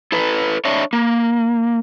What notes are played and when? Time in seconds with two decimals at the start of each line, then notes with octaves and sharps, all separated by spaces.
0.12 E4 A4 B4
0.65 D4 C#5 E5
0.93 A#3